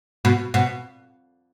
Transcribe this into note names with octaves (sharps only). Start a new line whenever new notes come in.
B2
B2